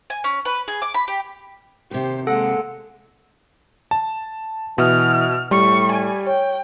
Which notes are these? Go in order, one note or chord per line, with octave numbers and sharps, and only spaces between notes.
G#5
C#4
B4
G#4
D6
B5
G4
D#2 C3 G4 C5
G#3 A#3 A4 F#5
A5
B2 E3 E5 D#6 F6
A2 G3 C#6
G#5
C#5 G5